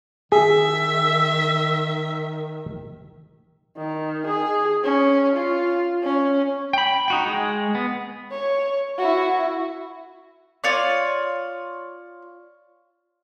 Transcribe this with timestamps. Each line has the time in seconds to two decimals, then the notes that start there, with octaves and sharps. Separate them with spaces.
0.32 D#3 G#4 E5
3.77 D#3
4.27 G#4
4.84 C#4
5.36 F4
6.04 C#4
6.73 G5 B5
7.08 D#4 F#4 G5
7.26 G#3
7.75 B3
8.31 C#5
8.99 E4 F#4
10.64 F4 C#5 D5